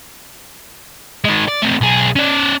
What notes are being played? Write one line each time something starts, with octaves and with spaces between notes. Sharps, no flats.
D#3 G#3
D5
A3 C4
B1 G#4
C#4 D5